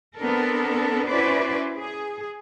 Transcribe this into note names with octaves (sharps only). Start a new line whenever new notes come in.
B3 C4 D4 A4 A#4
C#4 E4 F#4 B4 C5 D5
G#4